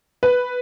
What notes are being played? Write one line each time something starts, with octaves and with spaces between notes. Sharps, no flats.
B4